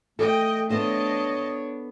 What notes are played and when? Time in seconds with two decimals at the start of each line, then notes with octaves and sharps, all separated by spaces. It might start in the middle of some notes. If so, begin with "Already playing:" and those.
0.19 A3 A4 D#5 G5
0.70 B3 D4 A4 C5 C#5 D#5 A5